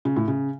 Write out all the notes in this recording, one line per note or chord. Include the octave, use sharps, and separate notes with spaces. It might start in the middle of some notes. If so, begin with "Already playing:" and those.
C#3
A2
C#3